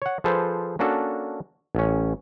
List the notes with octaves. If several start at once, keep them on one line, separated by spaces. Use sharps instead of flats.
C#5 F#5
F3 G#4 A4 B4 C5
A#3 C#4 D4 F#4 A4
A1 C#4